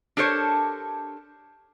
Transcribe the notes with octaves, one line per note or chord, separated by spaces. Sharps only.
D4 G4 A4 A#4 C5 C#5